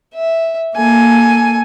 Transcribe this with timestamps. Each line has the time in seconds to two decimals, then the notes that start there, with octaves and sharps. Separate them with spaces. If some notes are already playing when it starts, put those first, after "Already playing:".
0.14 E5
0.76 A#3 A4 G#5